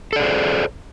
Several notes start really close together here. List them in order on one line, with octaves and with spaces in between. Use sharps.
A4 D5 G#4 C5